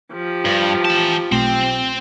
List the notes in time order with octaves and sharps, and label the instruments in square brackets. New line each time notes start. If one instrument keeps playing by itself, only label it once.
[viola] F3 G4
[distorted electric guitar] G2
E3 A5
[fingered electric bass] B1 A3 [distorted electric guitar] C4